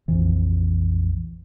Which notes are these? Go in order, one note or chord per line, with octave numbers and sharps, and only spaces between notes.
A#1 F2 E3